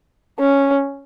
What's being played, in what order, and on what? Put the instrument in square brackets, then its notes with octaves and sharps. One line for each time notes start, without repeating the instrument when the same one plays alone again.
[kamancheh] C#4